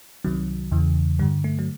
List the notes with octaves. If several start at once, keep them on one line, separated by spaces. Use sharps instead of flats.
C2 C3 D#3 F#3
E2 C#3 E3
G2 D3 G3
A3
F#3